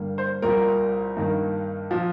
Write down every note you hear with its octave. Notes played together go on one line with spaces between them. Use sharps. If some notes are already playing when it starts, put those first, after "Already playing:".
Already playing: G2 D3 G3 A#3
C5
C2 A#2 G3 A#3 A#4
G2 D#3 A#3
A#2 F3